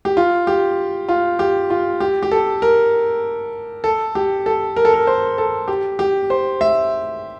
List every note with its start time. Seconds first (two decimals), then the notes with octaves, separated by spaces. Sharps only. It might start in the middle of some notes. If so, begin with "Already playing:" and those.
0.05 G4
0.17 F4
0.47 G4
1.09 F4
1.39 G4
1.70 F4
2.00 G4
2.23 G4
2.31 A4
2.62 A#4
3.84 A4
4.15 G4
4.46 A4
4.76 A#4
4.85 A4
4.94 A#4
5.07 C5
5.38 A4
5.68 G4
5.99 G4
6.30 C5
6.61 E5